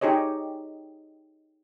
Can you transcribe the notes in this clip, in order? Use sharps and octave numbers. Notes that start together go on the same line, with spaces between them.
D#4 G4 G#4 C#5 D#5